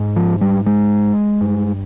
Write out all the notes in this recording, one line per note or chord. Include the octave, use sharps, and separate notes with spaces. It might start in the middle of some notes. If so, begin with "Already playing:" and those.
Already playing: G#2
F3
G3
G#3
G2